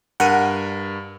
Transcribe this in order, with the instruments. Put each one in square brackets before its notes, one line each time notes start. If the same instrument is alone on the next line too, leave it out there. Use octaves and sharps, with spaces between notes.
[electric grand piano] G2 A#4 D#7 [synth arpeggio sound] F#5